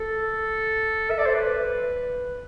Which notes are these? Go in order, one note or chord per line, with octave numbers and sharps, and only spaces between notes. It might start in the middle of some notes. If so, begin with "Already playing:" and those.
Already playing: A4
E5
D5
C5
B4